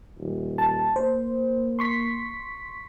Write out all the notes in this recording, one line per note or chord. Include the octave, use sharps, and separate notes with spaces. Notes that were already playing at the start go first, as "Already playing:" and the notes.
D#1
A5
A#3 C5
C6 C#6 B6